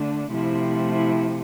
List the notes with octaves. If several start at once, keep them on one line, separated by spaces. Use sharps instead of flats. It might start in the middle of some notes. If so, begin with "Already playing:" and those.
Already playing: D3 A3 D4
C3 F3 A3 E4
E4